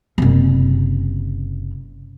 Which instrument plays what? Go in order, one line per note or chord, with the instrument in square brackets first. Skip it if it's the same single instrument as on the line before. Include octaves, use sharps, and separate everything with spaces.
[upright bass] F#1 C3